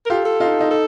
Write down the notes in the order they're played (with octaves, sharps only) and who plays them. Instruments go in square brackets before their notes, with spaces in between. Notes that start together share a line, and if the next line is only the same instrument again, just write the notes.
[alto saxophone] A#4
[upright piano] F4 G4 [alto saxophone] A4
[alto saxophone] A4
[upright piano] D#4 F4
D#4
[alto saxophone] A4